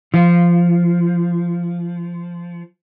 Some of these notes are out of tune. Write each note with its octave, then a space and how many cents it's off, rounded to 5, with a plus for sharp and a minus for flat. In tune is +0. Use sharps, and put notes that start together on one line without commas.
F3 -15 F4 +0